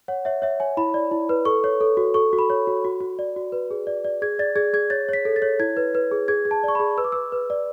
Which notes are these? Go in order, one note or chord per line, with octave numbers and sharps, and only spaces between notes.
C#5 F#5
C#5 E5
C#5 E5
C#5 G#5
E4 B5
D5
E4
B4
A4 C#6
C#5
A4
F#4
A4 C#6
F#4
B5
C#5
F#4
F#4
F#4
D5
F#4
B4
G#4
D5
D5
G#4 G#6
D5 A6
G#4 G#6
G#4 G#6
C#5 A6
C#5 B6
A4
A6
C#5
E4 G#6
B4
B4
G#4
G#4 G#6
G#4
A5
D5 C#6
B5
G#4
B4 E6
D6
B4 E6
B4
D5